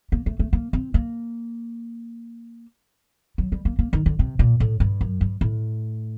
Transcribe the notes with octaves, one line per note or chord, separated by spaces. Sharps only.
A#3
A3
A3
A#3
C4
A#3
F#3
G3
A#3
A#3
D#3
D3
C3
A#2
A2
G2
F#2
G2
A2